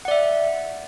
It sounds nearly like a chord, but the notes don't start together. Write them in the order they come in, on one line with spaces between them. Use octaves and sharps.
F#5 D5 E5